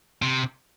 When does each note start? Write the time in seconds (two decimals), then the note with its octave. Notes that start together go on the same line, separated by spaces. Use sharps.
0.22 C3